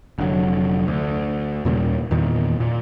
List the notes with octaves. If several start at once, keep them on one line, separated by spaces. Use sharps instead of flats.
F1 D3 F#3
D2
D#2 A#2 C#3 G3
E2 A#2 D#3
A#2